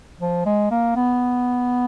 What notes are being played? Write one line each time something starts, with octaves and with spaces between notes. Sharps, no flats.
F3
G#3
A#3
B3